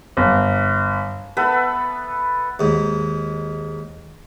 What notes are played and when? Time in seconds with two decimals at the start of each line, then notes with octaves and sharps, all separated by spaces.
0.17 G1
1.37 B3 A4 B4 E5
2.59 D#2 G#2